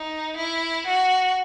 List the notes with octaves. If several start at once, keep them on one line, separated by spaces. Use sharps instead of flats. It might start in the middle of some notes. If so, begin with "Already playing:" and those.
Already playing: D#4
E4
F#4